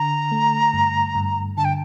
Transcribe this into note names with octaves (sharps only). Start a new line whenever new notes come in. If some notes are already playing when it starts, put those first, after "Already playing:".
Already playing: D3 A#5
A3
G2
G2
D3 A5
G5